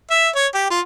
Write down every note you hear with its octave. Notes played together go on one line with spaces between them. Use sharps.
E5
C#5
G4
F4